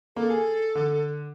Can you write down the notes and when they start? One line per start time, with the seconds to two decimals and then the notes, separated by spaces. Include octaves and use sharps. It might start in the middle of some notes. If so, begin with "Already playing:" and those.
0.16 A#3 A4
0.30 G#4
0.75 D3